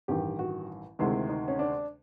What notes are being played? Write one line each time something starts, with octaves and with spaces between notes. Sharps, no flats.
A1 G2 D#3 G4
F#4
D2 C3 D#3 G#3 E4
D#4
C#4
D4